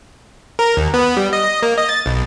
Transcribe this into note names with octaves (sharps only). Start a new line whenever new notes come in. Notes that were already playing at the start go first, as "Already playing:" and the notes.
A#4
D#2
B3
G3
D#5
D#5
A#3
D#5
A6
B1